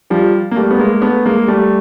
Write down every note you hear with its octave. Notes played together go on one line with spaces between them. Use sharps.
F3 G3
A#3
G3 A3
B3
G#3 A#3
A3 B3
G#3 A#3
G3 A3